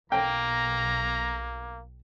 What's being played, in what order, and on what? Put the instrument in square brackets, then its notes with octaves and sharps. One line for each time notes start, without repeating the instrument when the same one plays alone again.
[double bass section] B1 [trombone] A#3 [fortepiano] G5 [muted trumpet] A#5